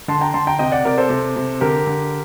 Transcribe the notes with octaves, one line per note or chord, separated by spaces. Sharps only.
D3 A5 C6
G5 A#5
D3 A5 C6
G5 A#5
C3 D#5 G5
D5 F#5
C3 A#4 D5
A4 C5
C3
C3
D3 G4 A#4
D3